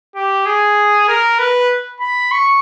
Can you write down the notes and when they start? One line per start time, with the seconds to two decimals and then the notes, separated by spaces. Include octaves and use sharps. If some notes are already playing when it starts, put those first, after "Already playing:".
0.15 G4
0.46 G#4
1.08 A#4
1.38 B4
2.00 B5
2.31 C#6